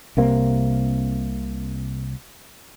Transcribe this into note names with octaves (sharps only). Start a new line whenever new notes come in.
C2 C3 A#3 C4